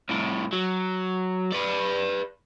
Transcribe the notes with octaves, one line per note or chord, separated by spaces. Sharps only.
C2 A2
F#3
B4 D5